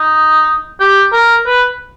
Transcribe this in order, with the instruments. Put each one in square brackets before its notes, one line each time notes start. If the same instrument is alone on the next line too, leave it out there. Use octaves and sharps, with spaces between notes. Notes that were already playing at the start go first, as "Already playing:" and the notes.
Already playing: [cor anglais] D#4
G4
A#4
B4